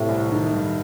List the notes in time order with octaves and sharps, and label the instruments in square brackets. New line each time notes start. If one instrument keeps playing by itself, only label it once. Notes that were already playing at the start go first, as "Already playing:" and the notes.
Already playing: [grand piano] A2 [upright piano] C3
[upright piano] C2
D#3
G2